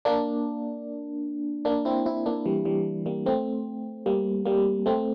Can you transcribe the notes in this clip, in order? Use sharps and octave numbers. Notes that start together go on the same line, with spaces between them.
A#3 D4
A#3 D4
C4 E4
C4 E4
A#3 D4
E3 G3
E3 G3
G3 A#3
A3 C4
G3 A#3
G3 A#3
A3 C4